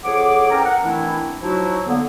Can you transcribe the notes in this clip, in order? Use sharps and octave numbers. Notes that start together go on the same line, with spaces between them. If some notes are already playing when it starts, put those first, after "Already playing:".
F2 G#4 C#5 F#5 D6
E3 C#4 A4 A#4 G5 A#5
F#5
D#3 E3 A3 C4 D4 E4
F3 F#3 D#4 E4 F#4
D3 A#3 B3